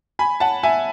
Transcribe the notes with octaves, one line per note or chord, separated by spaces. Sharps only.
G#5 B5
F#5 A5
E5 G#5